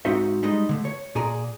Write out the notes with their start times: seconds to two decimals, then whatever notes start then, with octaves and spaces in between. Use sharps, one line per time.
0.05 G#2 C4 D#4 F#4 C5 E5
0.43 G3 G#3 D#4 D#5
0.69 D3 A3
0.85 C#5
1.15 A#2 G#4 D5 A#5